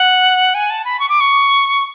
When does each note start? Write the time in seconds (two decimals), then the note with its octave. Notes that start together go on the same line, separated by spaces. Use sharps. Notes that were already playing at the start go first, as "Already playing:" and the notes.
Already playing: F#5
0.54 G#5
0.70 A5
0.85 B5
1.00 C#6
1.09 D6
1.20 C#6